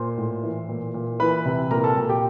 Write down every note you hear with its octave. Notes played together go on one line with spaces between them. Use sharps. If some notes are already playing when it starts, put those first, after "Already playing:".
Already playing: A#2 C5 C6
A2
E3
A#2
A#2
E3 B4 B5
C3
A#2 A#4 A#5
A4 A5
A#2
G4 G5